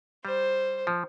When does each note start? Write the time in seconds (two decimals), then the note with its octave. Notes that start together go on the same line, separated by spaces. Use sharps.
0.24 G3 C5
0.87 F3